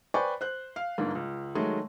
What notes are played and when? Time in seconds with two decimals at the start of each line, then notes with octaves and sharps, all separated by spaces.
0.14 B4 C5 D5 G5 G#5 C#6
0.41 C5 F#6
0.76 F5
0.98 G1 G#2 A#3 D4
1.15 C#2
1.55 D#3 F#3 G#3 A3